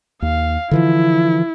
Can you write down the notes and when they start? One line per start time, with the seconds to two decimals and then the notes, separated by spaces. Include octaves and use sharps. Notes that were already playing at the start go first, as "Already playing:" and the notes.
0.22 D#2 F5
0.71 D3 E3 F3 E4